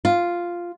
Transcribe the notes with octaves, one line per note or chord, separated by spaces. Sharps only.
F4